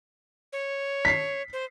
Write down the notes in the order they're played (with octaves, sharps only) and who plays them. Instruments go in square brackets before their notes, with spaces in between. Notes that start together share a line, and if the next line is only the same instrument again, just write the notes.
[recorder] C#5
[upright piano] B6 C7
[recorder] C5